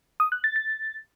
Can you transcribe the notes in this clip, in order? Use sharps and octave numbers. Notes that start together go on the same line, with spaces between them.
D#6
F#6
A6
A6